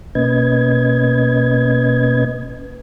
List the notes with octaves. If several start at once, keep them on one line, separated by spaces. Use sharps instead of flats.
B2 A#3 C#4 B4 D#5 G#6